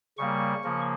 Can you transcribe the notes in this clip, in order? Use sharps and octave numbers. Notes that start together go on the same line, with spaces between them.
C#3 G3 A#3 C#6
C#3 F3 A#3